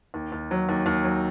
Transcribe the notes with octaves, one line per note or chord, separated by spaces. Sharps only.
D#2
D#2
F#3
D#2
D#2
F#3